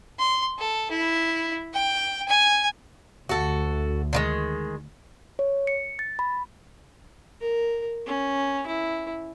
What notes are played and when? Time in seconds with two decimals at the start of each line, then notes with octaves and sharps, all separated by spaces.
0.19 C6
0.59 A4
0.91 E4
1.74 G5
2.28 G#5
3.29 D2 F#4 A4
4.13 D3 D#3 G#3
5.39 C#5
5.67 C#7
5.99 A6
6.19 B5
7.41 A#4
8.07 C#4
8.67 E4